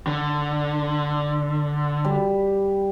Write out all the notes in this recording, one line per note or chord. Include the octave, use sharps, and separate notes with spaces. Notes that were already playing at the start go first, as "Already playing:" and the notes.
D3
G3